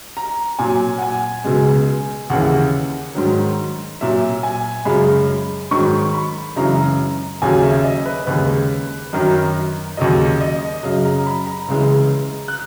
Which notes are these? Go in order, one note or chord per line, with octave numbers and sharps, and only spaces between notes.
A#5
A#2 F#3 G#5
F#5
G#5
C#2 B2 G#3
D#2 C#3 E3 F#5
G#2 D#3 F#3
A#2 F#3 E5
G#5
F#2 C#3 G#3 B5
G#2 D#3 F#3 C#6
B5
F#2 C#3 E3 G#3 A#5
D#2 C#3 F#3 G#5
E5
D#5
B4
D#2 C#3 G#3 B4
F#2 D#3 F#3
D#2 C#3 F#3 D#5
D#5
F#2 C#3 F#3
A#5
B5
A#5
C#2 C#3 E3 G#3
F#6